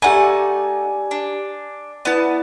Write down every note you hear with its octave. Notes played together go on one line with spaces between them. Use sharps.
A3 D#4 G4 D5 F#5 G#5 A#5
D4
B3 E4 D5 A5